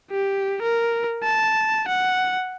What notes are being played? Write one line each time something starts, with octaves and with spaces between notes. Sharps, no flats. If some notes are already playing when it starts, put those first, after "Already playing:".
G4
A#4
A5
F#5